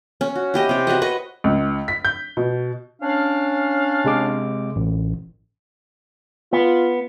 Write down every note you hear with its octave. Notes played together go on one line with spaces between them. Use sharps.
C#4
F#4
E4 G4 D#5
C3 G5
F#4 B4 C#5 D#5
B4 D#5 C#6
C#2
B6
G6
B2
C#4 D4 F5
C3 G#3 D6
A1
B3 F4